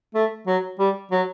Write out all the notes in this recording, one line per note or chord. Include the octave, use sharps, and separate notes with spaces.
A3
F#3
G3
F#3